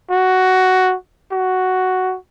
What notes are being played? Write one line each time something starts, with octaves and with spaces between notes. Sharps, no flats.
F#4
F#4